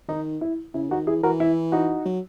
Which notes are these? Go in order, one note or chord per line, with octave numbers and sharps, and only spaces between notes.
D#3 D#4
E4
C#3 E4
D#3 D#4 F#4
E3 E4 G#4
E3 F#4 A#4
E4
D#4 F#4
F#3